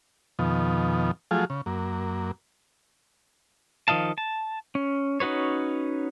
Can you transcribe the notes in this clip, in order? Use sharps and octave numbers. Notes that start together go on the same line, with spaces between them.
F2 B2 D#3 F3
F3 F#3 A3 F4 G#4
C#3
F#2 A#3
D#3 F3 D#5 F5 A5
A5
C#4
C#4 D#4 F#4 B4 C#5